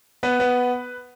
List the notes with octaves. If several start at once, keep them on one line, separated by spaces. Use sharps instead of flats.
B3 B4
B3